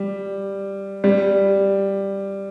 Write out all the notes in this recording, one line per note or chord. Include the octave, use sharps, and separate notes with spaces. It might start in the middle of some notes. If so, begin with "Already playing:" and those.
Already playing: G3
G3